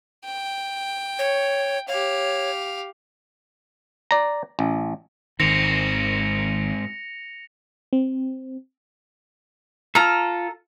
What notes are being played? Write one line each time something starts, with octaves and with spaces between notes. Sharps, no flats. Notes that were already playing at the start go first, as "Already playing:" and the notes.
G5
C#5
G4 C#5 F5
D5 A#5
A1
G#1 G#2 D#3 C4 A#6 C#7 F7
C4
F4 A4 A#5 F6